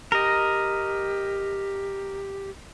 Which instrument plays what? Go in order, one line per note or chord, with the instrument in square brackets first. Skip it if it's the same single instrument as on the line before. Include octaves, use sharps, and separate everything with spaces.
[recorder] G4 [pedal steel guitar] A#4 D#5